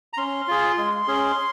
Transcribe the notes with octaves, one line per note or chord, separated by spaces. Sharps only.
A#5
C#4 C6
F4 G#4
G#3
C#4 G#4